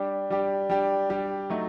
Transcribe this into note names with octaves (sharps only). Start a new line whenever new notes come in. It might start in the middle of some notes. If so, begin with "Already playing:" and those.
Already playing: G3 D4 G4
G3 D4 G4
G3 D4 G4
G3 D4 G4
F#3 A3 D#4